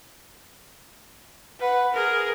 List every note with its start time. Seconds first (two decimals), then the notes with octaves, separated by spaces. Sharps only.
1.60 B4 F#5
1.93 G#4 A#4